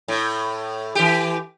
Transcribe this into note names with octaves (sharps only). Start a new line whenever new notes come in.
A2
E3 G4